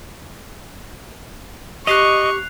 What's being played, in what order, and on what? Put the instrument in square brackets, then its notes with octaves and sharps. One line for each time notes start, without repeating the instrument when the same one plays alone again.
[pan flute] G4 [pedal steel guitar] D#5 [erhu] C#6 [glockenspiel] F#6 C7 F7